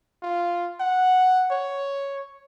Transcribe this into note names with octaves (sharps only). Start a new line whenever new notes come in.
F4
F#5
C#5